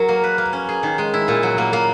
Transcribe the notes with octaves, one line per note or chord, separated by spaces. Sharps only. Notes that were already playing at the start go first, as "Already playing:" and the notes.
Already playing: F#3 G#4 A#4
A#3
B4
A#3
C#4
G#4
D#3
G#3
E4
A#2
F#3
A#3
A#3